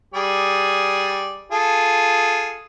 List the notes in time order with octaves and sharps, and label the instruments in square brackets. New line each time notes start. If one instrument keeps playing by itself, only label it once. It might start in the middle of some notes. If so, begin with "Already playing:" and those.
[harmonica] G3 G#4 D5
F4 G#4 A4